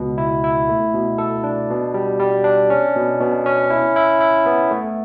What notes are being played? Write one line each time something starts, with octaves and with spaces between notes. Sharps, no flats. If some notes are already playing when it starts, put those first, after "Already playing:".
Already playing: C#2 B2
E4
E4
A3
B2
A4
D4
B2
G3
G3
D4
C#4
B2
B2
C#4
E4
E4
E4
B3
A3